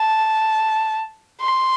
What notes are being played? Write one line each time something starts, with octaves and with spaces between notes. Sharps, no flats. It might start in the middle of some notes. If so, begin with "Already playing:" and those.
Already playing: A5
C6